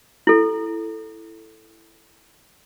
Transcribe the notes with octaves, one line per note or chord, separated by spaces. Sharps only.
E4 A4